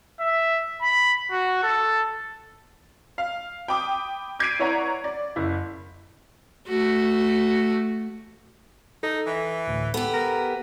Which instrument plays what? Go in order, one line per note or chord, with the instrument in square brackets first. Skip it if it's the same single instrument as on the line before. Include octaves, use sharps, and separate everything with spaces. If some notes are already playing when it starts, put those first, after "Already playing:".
[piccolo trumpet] E5
B5
F#4
A4
[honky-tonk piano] F5
G5 B5 D6 D#6
D6 G#6 B6 C7 D7 D#7
E4 B4 C#5 D5 F#5 A#5
D5
F#1 E4
[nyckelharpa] A3 F#4
[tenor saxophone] D#4 [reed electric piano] A4
[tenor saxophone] E3
[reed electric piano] D2 A2
[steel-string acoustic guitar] B3 G4 [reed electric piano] A4
[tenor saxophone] A#4